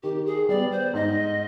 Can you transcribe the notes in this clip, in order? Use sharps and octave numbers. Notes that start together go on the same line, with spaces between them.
D#3 G4
G#4
G3 B3 D5
C5
G#2 D#5